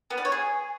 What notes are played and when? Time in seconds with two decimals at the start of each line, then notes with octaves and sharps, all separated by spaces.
0.10 B3
0.18 D5
0.25 C#5
0.32 G#4